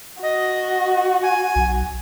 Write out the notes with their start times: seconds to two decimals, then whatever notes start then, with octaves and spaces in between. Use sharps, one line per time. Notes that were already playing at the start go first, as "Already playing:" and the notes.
0.23 F#4 D#5
1.23 G#5
1.56 B1